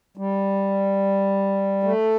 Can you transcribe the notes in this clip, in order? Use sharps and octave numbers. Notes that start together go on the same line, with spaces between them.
G3
A3